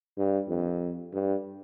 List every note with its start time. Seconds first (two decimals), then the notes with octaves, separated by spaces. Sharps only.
0.18 G2
0.49 F2
1.13 G2